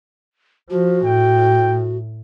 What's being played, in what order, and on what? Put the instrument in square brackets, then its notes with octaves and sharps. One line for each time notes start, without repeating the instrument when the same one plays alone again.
[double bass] F3 [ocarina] F#4
[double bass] A2 [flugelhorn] G5